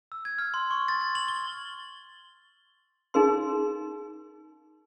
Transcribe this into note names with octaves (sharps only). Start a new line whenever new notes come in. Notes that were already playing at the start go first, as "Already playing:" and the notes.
E6
G#6
F6
C6
C#6
A6
A6
F#7
G7
D#4 G#4 A#4 C6